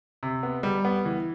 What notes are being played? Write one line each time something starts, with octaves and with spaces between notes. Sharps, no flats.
C3
B3
G3
B3
E3